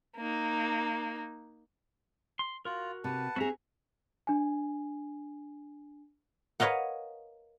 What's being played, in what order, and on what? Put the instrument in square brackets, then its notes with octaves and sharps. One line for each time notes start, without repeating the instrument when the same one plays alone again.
[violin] A#3 D#4
[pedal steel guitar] C6
[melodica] F4 [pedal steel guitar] F#4 A#4
[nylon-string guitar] C3 [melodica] B4 F#5 A5
[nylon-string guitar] C4 G#4 [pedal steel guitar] F#4 E5 A#5
[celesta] D4 G#5
[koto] A#4 B4 C#5 D#5 F5 F#5